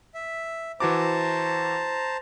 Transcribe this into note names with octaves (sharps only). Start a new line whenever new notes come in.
E5
E3 F#4 C5 A5 A#5 D6